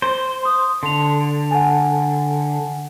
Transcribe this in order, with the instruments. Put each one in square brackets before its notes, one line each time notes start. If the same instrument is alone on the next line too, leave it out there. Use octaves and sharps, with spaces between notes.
[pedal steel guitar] C5
[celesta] C6 D#6
[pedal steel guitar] D3 [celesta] C6 F7
[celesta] F#5 G#5